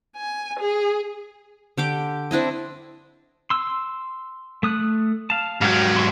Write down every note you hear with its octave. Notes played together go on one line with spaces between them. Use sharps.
G#5
G#4
D3 G4 D6
C4 D4 E4 D#5
C6 E6
A3 D#6 F#6
F5 A5
G#2 F#3 F5 G5
C6 C#6